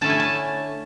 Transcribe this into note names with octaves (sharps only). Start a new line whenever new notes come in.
D3 A3 C#4 E4 A5
G#5
A5